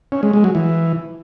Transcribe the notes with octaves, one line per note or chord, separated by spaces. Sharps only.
C#4
G#3
G#3
F#3
E3